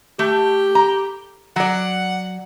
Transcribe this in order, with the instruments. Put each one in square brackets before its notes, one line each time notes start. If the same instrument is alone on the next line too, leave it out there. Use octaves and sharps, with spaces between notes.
[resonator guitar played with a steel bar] A3 [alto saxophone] G4
[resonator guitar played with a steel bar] A#5
[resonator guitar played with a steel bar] F#3 D5 [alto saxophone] F#5